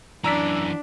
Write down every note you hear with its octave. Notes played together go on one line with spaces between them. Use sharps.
F#2 E3 D4 A#5 E6 B6